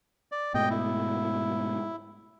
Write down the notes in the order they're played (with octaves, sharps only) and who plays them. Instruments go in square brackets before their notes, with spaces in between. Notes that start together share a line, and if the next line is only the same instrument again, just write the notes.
[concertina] D5
[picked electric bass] G#2 B2 A3 [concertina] D#5 G5
[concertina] E4